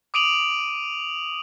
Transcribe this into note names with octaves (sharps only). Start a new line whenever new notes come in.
D6 D#6 D7 D#7 F7 F#7